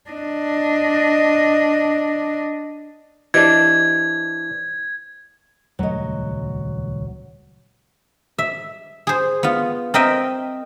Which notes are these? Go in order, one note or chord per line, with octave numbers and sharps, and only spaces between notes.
D4 D#5
E3 D4 G4 C5 D#5 G#6
D#1 C#2 F#3 A3 D#5
E5
G#4 C5
B3 F4
C4 A#4 D#5 E5 G5